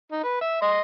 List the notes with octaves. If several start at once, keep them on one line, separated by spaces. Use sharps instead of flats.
D#4
B4
E5
D#5 C6